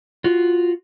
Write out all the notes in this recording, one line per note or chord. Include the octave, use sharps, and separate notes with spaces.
F4 F#4